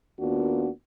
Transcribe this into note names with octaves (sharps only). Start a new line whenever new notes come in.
D#2 A#3 B3 D4 F4 F#4